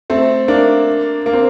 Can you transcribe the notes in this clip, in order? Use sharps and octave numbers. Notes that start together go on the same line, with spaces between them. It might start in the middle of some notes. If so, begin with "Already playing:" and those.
A3 C4
A#3 D4
A#3
C4